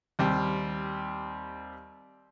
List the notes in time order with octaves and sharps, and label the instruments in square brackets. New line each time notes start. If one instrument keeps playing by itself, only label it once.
[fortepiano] D#2 G3 C4